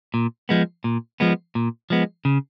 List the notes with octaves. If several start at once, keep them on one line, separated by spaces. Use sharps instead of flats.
A#2
F3 G#3 B3
A#2
F3 G#3 B3
A#2
F3 G#3 B3
C#3